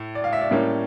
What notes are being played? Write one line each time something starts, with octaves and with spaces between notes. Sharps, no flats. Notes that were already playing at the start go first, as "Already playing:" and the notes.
Already playing: A2
D5
F5
E5
D5
A2 G3 A#3 C#4